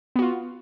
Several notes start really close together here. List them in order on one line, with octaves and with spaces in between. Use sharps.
B3 F#4 F4